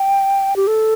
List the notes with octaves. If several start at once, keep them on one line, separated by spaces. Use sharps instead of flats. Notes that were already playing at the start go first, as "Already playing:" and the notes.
Already playing: G5
G4
A4